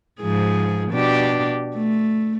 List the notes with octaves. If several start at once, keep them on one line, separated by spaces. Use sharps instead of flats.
G#2 F3 G#4
B2 D4 G4
A3